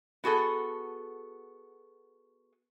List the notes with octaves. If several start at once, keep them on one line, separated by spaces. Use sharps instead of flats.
B3 F#4 G#4 A4